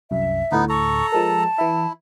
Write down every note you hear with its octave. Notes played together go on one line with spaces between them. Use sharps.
C2 F#2 E5
D2 A2 B3 D#4
A4 A#5 C#6
F3 G#3 A#4 A5
E3 E4 E5